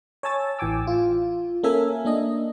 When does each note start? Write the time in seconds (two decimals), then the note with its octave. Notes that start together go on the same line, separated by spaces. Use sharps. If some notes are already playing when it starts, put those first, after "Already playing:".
0.23 C#5 G#5 A5 E6 A6
0.59 A1 E3 G5 G#5 D6 E6
0.87 F4
1.63 A#3 C#4 A4 A#4 E5 G#5
2.05 A#3 D4 D#5